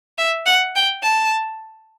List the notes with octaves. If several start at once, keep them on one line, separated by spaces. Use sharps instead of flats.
E5
F#5
G5
A5